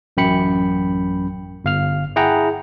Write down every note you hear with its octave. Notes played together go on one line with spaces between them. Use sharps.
A1 F#2 G5 B5 C#7
G1 F5 F6
E4 G#4 F#5 G5 A#5